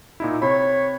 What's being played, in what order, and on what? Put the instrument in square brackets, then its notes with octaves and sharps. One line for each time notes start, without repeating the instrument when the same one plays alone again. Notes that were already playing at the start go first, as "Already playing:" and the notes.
[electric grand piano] A#2 D#4 E4
[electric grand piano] C3 B5 [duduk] C#5